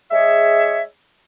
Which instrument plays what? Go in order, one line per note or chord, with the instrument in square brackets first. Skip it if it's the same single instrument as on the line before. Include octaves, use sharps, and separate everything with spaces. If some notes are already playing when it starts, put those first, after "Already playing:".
[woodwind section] G#3 G#4 C#5 E5